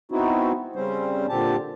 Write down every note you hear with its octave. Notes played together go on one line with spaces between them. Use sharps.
B3 C4 D#4 E4 F#4
C#3 G3 C4 C#4 C5
A#2 D3 C4 G4 A5